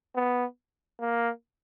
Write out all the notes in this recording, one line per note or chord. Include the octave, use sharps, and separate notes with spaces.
B3
A#3